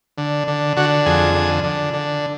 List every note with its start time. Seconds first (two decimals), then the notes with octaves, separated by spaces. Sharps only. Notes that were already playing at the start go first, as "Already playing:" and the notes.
0.18 D3
0.47 D3
0.77 D3 F#4
1.06 F2 G#4
1.35 D3
1.64 D3
1.94 D3